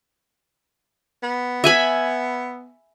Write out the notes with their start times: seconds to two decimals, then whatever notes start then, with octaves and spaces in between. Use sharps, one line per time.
1.23 B3
1.64 E5 G#5 B5